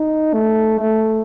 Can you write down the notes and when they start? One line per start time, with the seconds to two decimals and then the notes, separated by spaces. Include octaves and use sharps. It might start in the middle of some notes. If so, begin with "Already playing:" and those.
Already playing: D#4
0.33 A3
0.79 A3